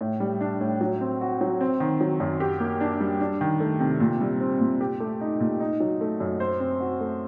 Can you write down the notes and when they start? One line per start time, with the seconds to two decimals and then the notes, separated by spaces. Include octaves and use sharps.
0.01 A2
0.20 G3
0.41 D4
0.61 A2
0.81 F#3
1.01 C4
1.21 F#4
1.41 F#3
1.61 C4
1.80 D#3
2.01 F#3
2.20 F#2
2.40 G4
2.60 A#3
2.81 D4
3.00 G3
3.21 D4
3.41 D#3
3.60 A3
3.80 C3
4.00 A#2
4.21 G3
4.40 C4
4.60 A#2
4.81 G4
5.00 A3
5.21 D#4
5.40 A#2
5.60 D#4
5.80 F#3
6.01 A3
6.20 F#2
6.40 C5
6.60 C4
6.80 F#4
7.01 A3